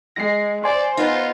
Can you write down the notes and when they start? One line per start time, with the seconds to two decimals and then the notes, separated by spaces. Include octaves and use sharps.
0.16 G#3 A#6 C7
0.64 C5 D5 G#5 C6
0.97 B3 D#4 F4